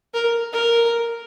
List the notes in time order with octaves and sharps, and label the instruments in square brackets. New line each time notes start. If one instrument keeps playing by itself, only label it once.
[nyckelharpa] A#4
A#4